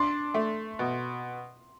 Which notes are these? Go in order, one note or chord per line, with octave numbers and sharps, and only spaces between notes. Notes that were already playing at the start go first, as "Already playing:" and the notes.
Already playing: D4 C6
A3
B2